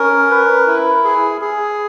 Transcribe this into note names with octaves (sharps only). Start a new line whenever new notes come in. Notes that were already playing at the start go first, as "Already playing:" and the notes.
Already playing: C#4 A#4
B4
E4
G#4
G#4